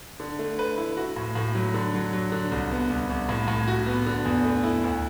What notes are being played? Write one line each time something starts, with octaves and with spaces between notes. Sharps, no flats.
D3
A3
B4
E4
F#4
A2
A2
F#3
D3
F#3
F#3
D3
C2
B3
C2
C2
A2
A2
F#4
B3
D3
E2
A3
E4
D2